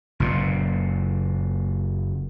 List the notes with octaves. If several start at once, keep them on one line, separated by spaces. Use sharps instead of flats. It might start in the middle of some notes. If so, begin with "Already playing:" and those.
F#1 A#2